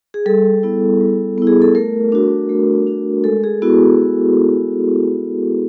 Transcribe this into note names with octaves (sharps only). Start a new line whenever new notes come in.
G#4
G3 A4
B3 E4
G3
B3 E4
G#4
A4
A3 A#4
D4 F#4
A3
D4 F#4
G#3 A4
G#4
B3 E4 F#4